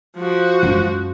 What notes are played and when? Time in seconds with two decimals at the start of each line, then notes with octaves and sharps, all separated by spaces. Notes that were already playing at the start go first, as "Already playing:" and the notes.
0.17 F3 F#4
0.63 F#2 G#3